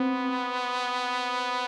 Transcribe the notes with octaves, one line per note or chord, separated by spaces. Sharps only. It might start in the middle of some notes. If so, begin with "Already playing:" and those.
Already playing: B3 C4